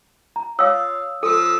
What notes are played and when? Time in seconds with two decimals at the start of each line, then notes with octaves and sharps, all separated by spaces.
0.36 A#5
0.59 F4 C#5 F5 D#6 E6
1.23 F3 A4 D#6 E6